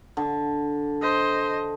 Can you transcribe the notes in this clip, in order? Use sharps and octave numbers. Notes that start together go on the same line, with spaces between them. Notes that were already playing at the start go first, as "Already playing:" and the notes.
D3
C5 D#5